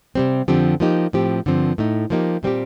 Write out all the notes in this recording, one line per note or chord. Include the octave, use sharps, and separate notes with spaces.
C3 G3 C4
F2 D3 F3 C4 G4
F3 A#3 D#4 G4
A2 F3 C4 G4
G2 D3 F3 C4
A2 A3 D#4
F3 A#3 D#4 G4
A#2 G3 C4 G4